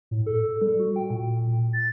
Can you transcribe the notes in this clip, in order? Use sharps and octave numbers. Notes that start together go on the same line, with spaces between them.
A2
A4
G3
F#4
G5
A#2
A6